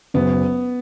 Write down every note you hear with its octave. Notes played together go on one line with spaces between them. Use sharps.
F#1 B3